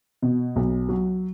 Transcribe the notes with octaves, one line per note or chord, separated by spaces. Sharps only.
B2
B1
F#3